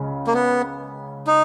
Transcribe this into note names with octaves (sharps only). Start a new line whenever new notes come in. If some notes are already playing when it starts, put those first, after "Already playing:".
Already playing: C#2 C#3 G#3
A#3
B3
D#4